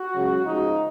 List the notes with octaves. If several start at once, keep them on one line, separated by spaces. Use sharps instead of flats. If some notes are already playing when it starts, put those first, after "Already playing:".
Already playing: F#4
C#2 C#3 F#3
C#2 C#3 F3 D#4